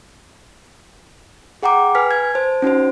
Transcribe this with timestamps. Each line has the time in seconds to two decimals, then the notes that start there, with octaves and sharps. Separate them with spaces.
1.63 G#4 F#5 G5 A#5 D6
1.95 B4 G#5 F6 B6
2.11 G#6
2.34 C5 A5
2.62 C#4 D#4 F#4 C5